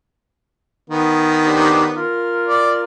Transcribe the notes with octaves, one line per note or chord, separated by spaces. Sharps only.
D#3 B3
D4 G4 C5
F4 A#4
D5